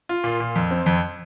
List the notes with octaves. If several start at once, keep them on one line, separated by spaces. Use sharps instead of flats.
F4
A#2
A#2
F2
C4
F2